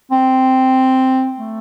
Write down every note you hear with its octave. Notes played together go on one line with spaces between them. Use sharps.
C4
A3